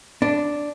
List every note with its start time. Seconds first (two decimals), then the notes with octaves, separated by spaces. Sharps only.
0.22 D4